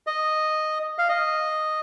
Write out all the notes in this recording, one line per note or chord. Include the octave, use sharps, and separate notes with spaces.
D#5
F5
D#5